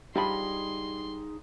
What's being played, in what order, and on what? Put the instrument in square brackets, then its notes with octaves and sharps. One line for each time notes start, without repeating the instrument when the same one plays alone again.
[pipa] F3 D4 B5 [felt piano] G3 [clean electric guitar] D#4 G#4 D#5 [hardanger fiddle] C6